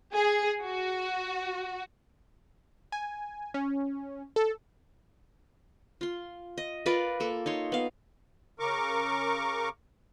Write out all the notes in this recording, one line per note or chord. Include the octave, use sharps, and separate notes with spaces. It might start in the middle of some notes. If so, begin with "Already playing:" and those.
G#4
F#4
G#5
C#4
A4
F4 C6
D#5
F4 A#4 B4 D5
A#3 A4
D#4 C#5 C6
B3 F5
C#3 A#4 C#6 D6